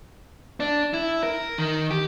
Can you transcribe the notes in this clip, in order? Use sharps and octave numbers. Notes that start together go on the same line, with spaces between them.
D4
E4
A#4
D#3
G4